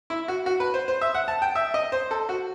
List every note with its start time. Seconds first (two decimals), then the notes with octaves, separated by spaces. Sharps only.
0.10 E4
0.28 F#4
0.46 F#4
0.60 B4
0.74 C5
0.88 C5
1.01 E5
1.15 F#5
1.28 A5
1.42 G5
1.55 E5
1.74 D#5
1.92 C5
2.11 A4
2.29 F#4